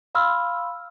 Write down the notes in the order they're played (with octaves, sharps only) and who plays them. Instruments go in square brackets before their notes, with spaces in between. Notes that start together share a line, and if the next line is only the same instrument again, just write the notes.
[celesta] F5 B5 C6 E6 F6